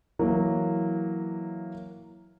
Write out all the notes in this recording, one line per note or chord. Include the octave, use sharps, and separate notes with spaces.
E3 F#3 A#3